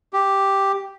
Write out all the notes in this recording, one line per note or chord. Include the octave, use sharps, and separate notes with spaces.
G4